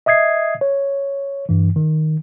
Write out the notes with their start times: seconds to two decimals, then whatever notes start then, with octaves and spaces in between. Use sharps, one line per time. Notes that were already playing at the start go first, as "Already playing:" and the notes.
0.06 D#5 E5 D#6 G#6 C7
0.61 C#5
1.49 G2 E3
1.76 D#3